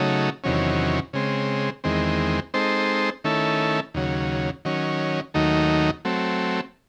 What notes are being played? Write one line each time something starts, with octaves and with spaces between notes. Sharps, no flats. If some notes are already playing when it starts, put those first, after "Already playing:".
Already playing: C#3 F#3 A3 D#4
E2 C3 D#3 F#3 C#4
C#3 G#3 C4
E2 D#3 G#3 C4
G#3 C4 D#4 A4 C5
D#3 A3 C#4 E4 A4
D#2 C#3 F#3
D#3 F#3 C#4
D#2 D#3 F#3 A3 D#4
F#3 A3 C4